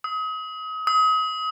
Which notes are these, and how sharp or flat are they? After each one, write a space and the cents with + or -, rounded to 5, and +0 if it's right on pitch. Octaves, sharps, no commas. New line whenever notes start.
D#6 +35
D#6 +35